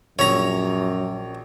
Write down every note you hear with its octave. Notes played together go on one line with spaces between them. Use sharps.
A#1 F#2 C#5 A#5